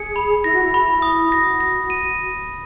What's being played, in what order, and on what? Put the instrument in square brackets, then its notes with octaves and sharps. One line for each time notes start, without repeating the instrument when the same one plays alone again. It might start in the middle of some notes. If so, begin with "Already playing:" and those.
Already playing: [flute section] G#4 [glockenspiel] C#7
[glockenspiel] B5
[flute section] E4 [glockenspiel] A#6
[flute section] F#4
E4
[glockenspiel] B5
D#6
[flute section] F#4 [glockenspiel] A#6
[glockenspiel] A#6
D#7